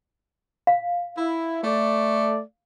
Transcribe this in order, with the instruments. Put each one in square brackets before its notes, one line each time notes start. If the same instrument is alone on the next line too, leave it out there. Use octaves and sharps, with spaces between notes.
[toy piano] F5
[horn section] E4
A3 D5